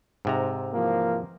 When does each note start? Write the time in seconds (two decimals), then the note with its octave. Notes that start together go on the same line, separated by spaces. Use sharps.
0.25 G#2 C3 A#5
0.74 E3 F3 A#3